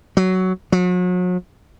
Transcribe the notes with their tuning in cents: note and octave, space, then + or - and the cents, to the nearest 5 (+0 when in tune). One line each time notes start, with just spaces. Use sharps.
F#3 +10
F#3 -40